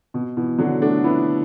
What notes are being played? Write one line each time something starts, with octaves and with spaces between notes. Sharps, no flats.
B2
B2 E3
D3 F#3
A3 D4
B3 E4